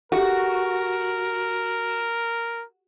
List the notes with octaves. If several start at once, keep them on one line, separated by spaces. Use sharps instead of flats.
F#4 G4 A4 A#4